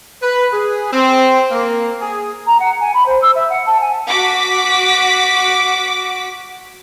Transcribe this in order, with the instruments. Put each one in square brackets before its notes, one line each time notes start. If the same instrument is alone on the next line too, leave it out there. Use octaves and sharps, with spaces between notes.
[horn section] B4
G#4
C4
A#3
G#4
[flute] A#5
F#5
G#5
B5
C5
E6
E5
F#5
A5
G#5
[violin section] F#4 D6 B6